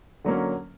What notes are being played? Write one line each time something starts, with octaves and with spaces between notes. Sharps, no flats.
D3 F#3 A#3 C#4